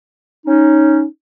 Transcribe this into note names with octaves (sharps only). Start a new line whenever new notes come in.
C#4 D#4